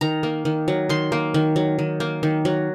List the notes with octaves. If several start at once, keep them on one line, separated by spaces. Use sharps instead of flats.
D#3 A#5
A#3
D#3
F#3
D#3 C6
A#3
D#3
F#3
D#3
A#3
D#3
F#3